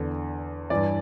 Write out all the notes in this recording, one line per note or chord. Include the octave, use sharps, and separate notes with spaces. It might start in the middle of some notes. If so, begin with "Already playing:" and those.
Already playing: E2 D3
G2 E3 D5